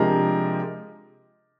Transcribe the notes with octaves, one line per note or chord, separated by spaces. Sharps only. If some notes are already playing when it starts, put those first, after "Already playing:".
Already playing: C3 F3 G#3 D4 G4 A#4